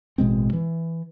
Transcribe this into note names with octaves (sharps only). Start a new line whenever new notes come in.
A1 B2 G#3 C4
E3